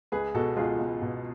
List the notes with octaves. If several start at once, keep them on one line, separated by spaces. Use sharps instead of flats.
C#2 G#4 B4
B2 F#4 A4
C#2 F4 G#4
C#2
B2